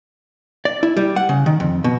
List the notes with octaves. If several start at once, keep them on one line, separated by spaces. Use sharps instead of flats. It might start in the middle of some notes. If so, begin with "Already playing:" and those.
D5
E4
G3
F#5
C#3
D#3
F2
B2